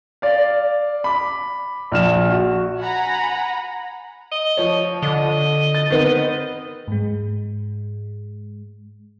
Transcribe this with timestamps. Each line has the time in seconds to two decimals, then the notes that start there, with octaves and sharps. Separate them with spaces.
0.22 D5 F5
1.04 B5 D6
1.92 A#1 F6 E7
2.30 F#4
2.79 F#5 G#5 A#5 B5
4.31 D#5
4.57 F3 C#5
5.03 D3 D#5
5.75 A6
5.90 D#3 B3 C4
6.88 G#2 G#3